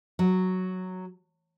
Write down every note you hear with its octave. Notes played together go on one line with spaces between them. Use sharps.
F#3